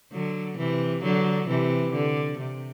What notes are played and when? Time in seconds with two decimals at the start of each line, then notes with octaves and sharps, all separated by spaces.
0.12 D3 F#3
0.58 C3 E3
1.03 D3 F#3
1.48 C3 E3
1.93 D3
2.39 C3